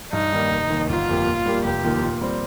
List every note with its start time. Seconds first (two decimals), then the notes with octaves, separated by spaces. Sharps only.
0.13 G2 D#4
0.32 D#3 G3 A#3
0.51 F1
0.70 D#2 D#3
0.89 G1 F4
1.09 F2 F3 A#3 G4
1.27 A#2
1.46 G3 A#3 G4
1.64 F1 G4
1.84 D#2 D#3 A#3 F4
2.03 A#2
2.21 G3 C4